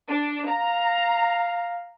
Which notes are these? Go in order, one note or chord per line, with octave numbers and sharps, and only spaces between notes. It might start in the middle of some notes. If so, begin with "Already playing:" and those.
D4
F5 A#5